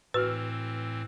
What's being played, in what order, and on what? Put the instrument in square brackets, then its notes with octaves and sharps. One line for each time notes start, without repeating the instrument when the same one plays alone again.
[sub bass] A2 [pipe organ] E3 C4 [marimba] F#4 B4 [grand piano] E6 F6